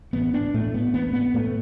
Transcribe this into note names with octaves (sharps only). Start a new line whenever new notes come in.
A1 B3
D4
A2 A3
B3
A1 B3
B3
A2 A3